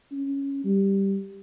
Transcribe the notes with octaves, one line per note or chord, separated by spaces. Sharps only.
C#4
G3